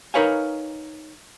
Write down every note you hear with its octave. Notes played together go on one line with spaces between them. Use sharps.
D#4 A#4 B4 C#5 F5 G#5